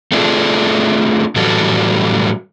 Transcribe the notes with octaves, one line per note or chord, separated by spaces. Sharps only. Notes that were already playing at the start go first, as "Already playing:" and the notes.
A3 C4 D4 F4 G#4 A4
A2 E3 F#3 G3 F#4 A4